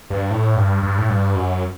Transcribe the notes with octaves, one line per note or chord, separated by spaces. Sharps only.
G2
A2
G2
G2
A2
G2
F#2